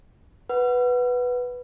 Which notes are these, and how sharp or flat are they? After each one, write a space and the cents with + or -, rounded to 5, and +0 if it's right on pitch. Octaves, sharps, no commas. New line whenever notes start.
B4 +0 F#5 +0